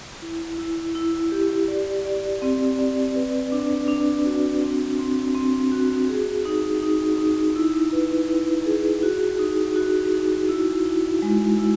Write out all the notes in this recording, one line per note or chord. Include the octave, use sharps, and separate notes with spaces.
E4
E4
E4
G4
D5
D5
C4
D5
B4
D4
D4
F#4
C4
C4
C4
F#4
G#4
D#4
D#4
D#4
E4
B4
E4
G#4
F#4
D#4
F#4
D#4
E4
E4
G#3
E4